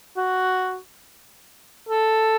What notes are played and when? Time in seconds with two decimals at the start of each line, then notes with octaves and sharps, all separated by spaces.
0.17 F#4
1.89 A4